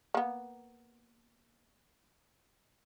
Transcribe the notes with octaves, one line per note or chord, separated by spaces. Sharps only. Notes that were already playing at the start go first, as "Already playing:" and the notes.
A#3 B3